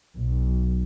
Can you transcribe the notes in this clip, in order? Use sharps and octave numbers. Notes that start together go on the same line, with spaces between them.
B1